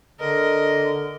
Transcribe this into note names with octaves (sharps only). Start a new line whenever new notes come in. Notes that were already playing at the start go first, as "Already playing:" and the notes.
D3 A#4 D#5